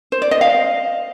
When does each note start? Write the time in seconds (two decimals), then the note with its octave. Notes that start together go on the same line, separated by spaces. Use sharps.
0.12 C5
0.22 D5
0.31 D#5
0.41 F5